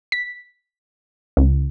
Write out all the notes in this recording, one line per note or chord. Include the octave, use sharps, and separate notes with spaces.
B6
C#2